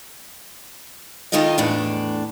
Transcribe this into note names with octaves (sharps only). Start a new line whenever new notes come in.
D#2 D#3 D#4 F4 A4 D#5
E2 A2 D4